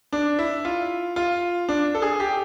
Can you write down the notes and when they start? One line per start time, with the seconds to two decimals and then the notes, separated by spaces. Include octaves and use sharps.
0.13 D4
0.39 E4
0.65 F4
1.16 F4
1.69 D4
1.95 A4
2.02 G#4
2.20 G4